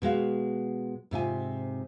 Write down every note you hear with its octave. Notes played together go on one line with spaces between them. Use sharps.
B2 G#3 F#4 F5
G#2 C3 F4 G#5